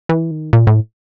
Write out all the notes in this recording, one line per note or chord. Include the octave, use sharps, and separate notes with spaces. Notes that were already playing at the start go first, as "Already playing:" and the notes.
E3
D#3
A#2
A2